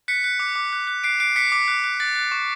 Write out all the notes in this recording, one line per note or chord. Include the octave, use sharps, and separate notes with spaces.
F#6 B6 C#7
F#6
D6
D6
F#6
F#6
F#6 C7 D7
F#6 C7 D7
D6 B6 C#7
D6 B6
F#6
F#6
F#6 A6
F#6
C#6